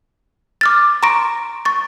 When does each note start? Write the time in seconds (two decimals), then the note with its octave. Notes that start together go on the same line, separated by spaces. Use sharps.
0.61 D6 F6 A6
1.03 A#5 C6 C#6 A#6 D7
1.65 C#6 A6